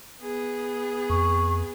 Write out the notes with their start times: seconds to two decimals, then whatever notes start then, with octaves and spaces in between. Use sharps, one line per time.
0.21 B3 G#4
1.10 F2 C#6